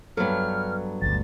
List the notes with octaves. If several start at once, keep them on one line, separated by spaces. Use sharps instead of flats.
G2 F#3 B3 A4 F6
G1 D2 A6